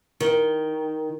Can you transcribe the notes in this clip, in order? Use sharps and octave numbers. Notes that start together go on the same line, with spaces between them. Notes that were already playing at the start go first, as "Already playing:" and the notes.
D#3